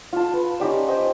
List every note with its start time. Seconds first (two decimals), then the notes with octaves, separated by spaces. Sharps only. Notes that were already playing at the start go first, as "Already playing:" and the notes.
0.13 F4 A5
0.33 B4
0.60 C#4 D#4 G4 D5
0.88 C5 D#5 G5